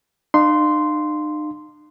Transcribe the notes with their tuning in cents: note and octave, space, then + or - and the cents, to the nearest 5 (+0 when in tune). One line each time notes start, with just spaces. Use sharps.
D#4 -45 F5 +0 C6 -5